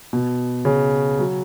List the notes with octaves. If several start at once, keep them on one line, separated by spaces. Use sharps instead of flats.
B2
C#3
F#3